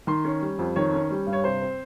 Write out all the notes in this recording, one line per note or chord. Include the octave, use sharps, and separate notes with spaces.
D#3 C6
C#4
G3
F2
D#3 C#5
C#4
G3
G2
C#5
C3 C5
C4